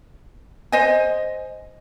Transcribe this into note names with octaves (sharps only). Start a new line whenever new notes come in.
C5 D#5 G#5